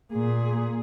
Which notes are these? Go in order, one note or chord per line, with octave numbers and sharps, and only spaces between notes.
A#2 G#4